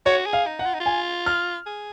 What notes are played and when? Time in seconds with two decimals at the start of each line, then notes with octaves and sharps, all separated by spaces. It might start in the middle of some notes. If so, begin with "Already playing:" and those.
0.06 F#4 C#5
0.26 G#4
0.33 F5
0.47 D#4
0.59 F#5
0.65 F4
0.74 D#4
0.81 F4
0.86 G#5
1.26 F6
1.66 G#4